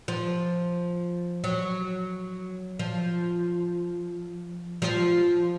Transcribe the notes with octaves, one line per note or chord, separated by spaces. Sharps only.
F3
F#3
F3
F3